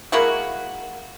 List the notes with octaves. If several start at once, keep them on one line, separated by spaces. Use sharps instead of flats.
G#3 A#3 E4 F#4